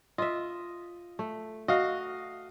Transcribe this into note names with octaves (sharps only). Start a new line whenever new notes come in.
F4 D#5 E5
A3
F#4 D#5 F5